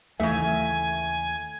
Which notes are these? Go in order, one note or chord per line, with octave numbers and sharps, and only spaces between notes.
D#2 C#3 E3 A3 E5 G#5